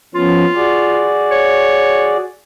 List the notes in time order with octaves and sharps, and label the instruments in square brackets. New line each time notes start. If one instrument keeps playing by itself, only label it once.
[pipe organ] F3 B3 C#4 [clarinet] F4
[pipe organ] F#4 G#4 D5
[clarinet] C#5